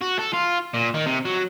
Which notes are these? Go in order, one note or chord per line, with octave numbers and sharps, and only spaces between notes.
F#4
A4
F4
A#2
D#3
C3
F#3